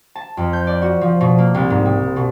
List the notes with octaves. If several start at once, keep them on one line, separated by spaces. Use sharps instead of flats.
A5
F2
G6
D5
F#4
F3
B2
A#3
C2
G#2
G3
B2